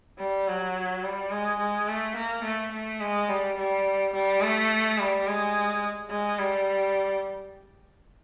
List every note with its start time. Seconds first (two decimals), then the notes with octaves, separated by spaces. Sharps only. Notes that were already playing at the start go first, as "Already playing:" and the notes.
0.19 G3
0.48 F#3
1.03 G3
1.31 G#3
1.59 G#3
1.88 A3
2.16 A#3
2.44 A3
2.72 A3
3.01 G#3
3.29 G3
3.57 G3
4.13 G3
4.42 A3
4.99 G3
5.27 G#3
6.10 G#3
6.39 G3